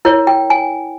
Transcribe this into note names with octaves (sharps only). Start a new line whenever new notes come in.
E4 A#4 C#5
G5
G#5